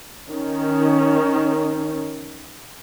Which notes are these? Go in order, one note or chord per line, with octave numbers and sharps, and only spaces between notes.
D#3 C#4